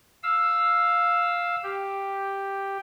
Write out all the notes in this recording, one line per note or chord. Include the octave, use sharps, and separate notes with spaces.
F5 E6
G4